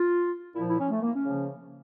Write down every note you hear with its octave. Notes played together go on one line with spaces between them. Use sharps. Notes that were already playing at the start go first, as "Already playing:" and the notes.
Already playing: F4
A#2 F3 E4
E4
C#4
A3
A#3
C#4
C#3 F3